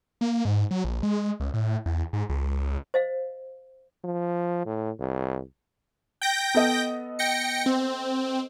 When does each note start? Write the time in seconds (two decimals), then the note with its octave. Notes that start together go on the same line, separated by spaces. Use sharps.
0.21 A#3
0.45 G#2
0.71 F#3
0.84 A#1
1.03 G#3
1.40 C#2
1.54 A2
1.86 E2
2.13 G#2
2.29 C#2
2.94 C5 D#5 F5
4.04 F3
4.66 A2
5.00 C2
6.22 G5 G6 A#6
6.55 B3 A4 D#5
7.19 G5 A#6 C#7
7.66 C4